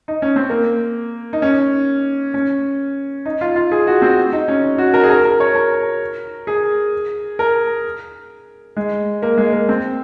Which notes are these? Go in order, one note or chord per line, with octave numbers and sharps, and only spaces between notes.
D#4
C#4
C4
A#3
D#4
C#4
C#4
D#4
F4
F4
G#4
F#4
C4
D#4
C#4
F#4
A#4
G#4
A#4
A#4
C#5
A#4
G#4
A#4
G#3
A#3
G#3
A#3
C4